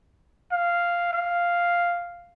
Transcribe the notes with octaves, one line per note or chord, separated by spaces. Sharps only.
F5
F5